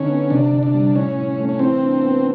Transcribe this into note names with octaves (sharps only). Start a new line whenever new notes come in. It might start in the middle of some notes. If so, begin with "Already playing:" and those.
Already playing: D3 C#4 D#4
B3
C3 D4
C3
D4
G3
A2 C#4
A2
A3
C#4
E3 C4
D4
B3